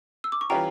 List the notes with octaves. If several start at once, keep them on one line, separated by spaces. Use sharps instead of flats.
E6
D6
C#6
E3 G3 C#4 F4 G5 A#5